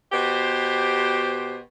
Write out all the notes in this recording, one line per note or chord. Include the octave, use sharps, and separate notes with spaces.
B2 G4 C5